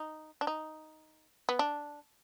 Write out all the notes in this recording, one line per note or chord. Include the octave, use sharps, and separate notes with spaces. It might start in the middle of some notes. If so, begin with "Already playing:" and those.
Already playing: D#4
D4
D#4
B3
D4